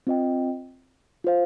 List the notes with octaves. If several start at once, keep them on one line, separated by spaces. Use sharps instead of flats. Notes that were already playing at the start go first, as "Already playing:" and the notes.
C4 F4 D#5 G5
F4 C5 F5